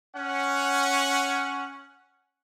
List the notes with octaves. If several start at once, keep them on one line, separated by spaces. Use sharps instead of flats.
C#4 F#5